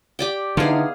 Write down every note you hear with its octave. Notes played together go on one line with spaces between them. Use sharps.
G4 D5 G5
D3 E3 B3 D#4 G#4 F5